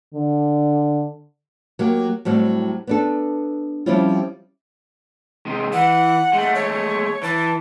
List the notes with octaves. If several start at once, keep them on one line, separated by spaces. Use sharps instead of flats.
D3
F#3 A#3 G4
A2 F#3 G3 C4
B3 D4 A4
F3 G3 C4 C#4 E4 F4
C3 G#3
E3 F#5
G#3 A3
C#5
E3 A5